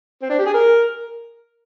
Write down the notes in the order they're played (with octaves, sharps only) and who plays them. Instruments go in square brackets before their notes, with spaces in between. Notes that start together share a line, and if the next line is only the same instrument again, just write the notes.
[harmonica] C4
D4
G4
G#4
A#4